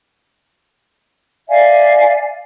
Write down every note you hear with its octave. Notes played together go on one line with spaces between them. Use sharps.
D5 E5 F5 G#5